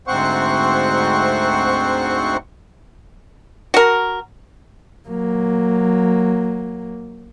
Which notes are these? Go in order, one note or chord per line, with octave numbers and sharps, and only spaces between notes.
D2 G#2 C4 C5 F#5 C#6
F#4 A#4
F#3 A#3